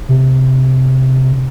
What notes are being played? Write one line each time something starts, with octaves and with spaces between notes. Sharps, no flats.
C3